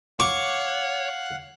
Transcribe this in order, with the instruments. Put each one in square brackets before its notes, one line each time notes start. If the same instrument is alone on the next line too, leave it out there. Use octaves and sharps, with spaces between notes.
[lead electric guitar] C#5 [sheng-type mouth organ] F5 F#5 F#6 [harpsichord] C#6 [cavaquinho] D6